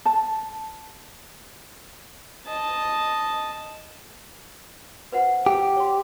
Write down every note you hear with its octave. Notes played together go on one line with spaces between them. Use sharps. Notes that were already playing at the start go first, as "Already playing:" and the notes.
A5
D#5 A5
B4 C5 F#5
G4 G5
C#5 C6